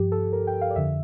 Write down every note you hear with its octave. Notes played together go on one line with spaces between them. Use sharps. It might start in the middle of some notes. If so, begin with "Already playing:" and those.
Already playing: G2 F3 G4
A4
A#4
G5
F5
D5
F2 D3 F3 E5